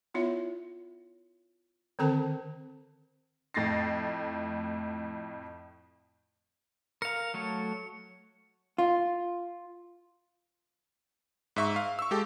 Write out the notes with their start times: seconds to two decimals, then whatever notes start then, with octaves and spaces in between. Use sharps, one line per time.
0.14 B3 E4 F4 C#5 E5
1.99 D3 D#3 C4 A4 C5 A5
3.54 F2 A2 A6 A#6 C7
7.02 A#4 F5 C#7
7.34 F#3 A3 C#5
8.78 F4
11.56 G#2 E5 C#6
11.76 F5
11.99 C#6 E6
12.11 G#3 G4 A4